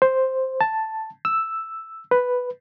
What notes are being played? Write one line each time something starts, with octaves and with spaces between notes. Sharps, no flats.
C5
A5
E6
B4